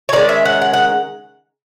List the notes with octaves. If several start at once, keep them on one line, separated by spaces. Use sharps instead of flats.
C#5
D#3 G#3 C#4 D5
E5
F#5
F#5
F#5